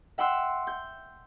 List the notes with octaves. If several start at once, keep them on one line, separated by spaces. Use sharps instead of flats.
E5 F#5 G5 C6 E6 F#6
G6